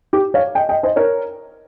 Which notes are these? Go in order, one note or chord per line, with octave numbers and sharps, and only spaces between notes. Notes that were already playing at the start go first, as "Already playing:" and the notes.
G4
C#5 F5
D#5 G5
D#5 G5
C5 D#5
A#4 C#5